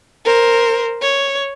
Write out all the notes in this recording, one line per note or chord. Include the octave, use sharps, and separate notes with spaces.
A#4 C5
C#5